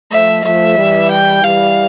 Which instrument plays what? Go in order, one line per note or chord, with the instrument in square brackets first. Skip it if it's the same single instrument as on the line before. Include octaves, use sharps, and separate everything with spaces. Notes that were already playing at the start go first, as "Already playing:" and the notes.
[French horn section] F3 A3 [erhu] E5
[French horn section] F3 A3 [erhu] E5
[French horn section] E3 G3
[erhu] G5
[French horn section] E3 G3 [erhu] F5